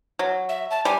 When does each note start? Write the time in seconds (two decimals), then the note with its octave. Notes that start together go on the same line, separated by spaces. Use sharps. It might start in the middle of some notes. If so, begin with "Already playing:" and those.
0.19 F#3
0.49 E5
0.71 A5
0.85 G3 G#5